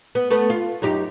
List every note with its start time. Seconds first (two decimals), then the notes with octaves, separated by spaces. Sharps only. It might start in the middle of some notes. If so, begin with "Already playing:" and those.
0.15 B3
0.30 A3 B3 B4
0.50 F4
0.82 F#2 D#4 G4